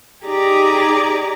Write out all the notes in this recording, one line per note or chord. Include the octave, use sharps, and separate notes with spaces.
D#4 G4 G#4 D5 A#5